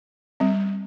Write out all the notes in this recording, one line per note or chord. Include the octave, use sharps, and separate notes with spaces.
G3 C4